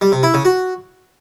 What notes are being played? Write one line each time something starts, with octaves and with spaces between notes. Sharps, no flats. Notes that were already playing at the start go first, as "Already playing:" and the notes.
G3
C3
E4
C#3
F#4